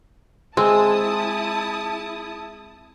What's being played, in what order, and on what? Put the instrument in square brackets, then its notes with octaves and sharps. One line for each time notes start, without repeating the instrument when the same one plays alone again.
[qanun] G#3 [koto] C4 [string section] E4 A5 D#6